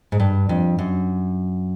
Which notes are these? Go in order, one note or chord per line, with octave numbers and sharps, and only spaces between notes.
G#2
G2
F2
F#2